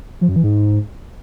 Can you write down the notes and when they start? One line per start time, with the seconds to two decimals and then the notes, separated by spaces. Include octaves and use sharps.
0.21 F3
0.29 F#2
0.36 E3
0.43 G#2